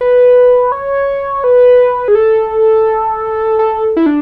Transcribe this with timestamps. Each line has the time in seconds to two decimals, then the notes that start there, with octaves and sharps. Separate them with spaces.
0.01 B4
0.72 C#5
1.44 B4
2.08 G#4
2.15 A4
3.59 A4
3.97 E4
4.06 D4